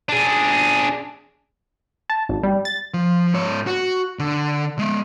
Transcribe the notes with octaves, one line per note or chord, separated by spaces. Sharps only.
D4 G#4
A5
G#1
G3
A6
F3
G#2 C#5
F#4
D3
G#3 E5